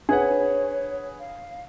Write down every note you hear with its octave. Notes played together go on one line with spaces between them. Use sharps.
D4 G#4 B4 C#5 F#5
F5